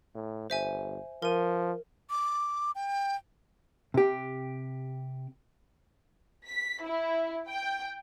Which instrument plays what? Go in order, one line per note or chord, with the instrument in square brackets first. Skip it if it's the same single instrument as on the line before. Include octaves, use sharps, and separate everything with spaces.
[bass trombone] A2
[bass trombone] G1 [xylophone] C5 E5 G#5
[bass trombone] F3 [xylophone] A#4 D#7
[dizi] D6
G5
[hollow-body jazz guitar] C3 G4
[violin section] B6
E4
G5